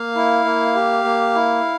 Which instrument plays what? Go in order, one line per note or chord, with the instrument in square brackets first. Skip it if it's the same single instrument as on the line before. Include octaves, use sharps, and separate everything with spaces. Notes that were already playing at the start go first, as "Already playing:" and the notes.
Already playing: [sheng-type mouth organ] A#3 F5
E4
A#3
G4
A#3
E4